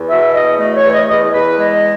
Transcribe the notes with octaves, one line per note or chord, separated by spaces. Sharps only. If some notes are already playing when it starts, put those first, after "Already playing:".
Already playing: E2
B2 E5
E2 D#5
A3 D#5
C#5
E2
D#5
E2 D#5
E2 B4
G#3 D#5